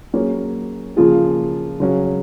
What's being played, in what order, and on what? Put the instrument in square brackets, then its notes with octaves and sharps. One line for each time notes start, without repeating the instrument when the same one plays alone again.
[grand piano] F#3 A#3 C#4 G#4 C#5
C#3 F3 A#3 F4 G#4
C#3 F#3 C#4